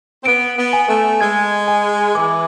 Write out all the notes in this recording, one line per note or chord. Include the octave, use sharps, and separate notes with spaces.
C4
B3 D7
B3
G#5
A3
G#3 G#6
G#5
E3 D6